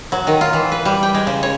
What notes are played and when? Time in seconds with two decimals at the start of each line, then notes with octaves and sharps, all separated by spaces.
0.12 F#3
0.27 D#3
0.41 F4
0.53 E3
0.72 B4
0.85 G3
1.03 G5
1.15 G#3
1.27 C#3
1.43 C#5